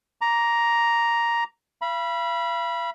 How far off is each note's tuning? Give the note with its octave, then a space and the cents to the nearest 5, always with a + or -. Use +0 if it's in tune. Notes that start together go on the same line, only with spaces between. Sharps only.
A#5 +5 D6 -20
F5 -45 B5 -20